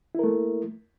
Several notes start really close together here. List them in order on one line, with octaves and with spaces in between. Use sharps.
E4 A#4 A3 A#3